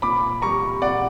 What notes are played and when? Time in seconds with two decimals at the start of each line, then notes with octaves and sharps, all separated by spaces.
0.02 A#2 B5 D6
0.42 G3 A#5 C#6
0.82 A#2 D5 F#5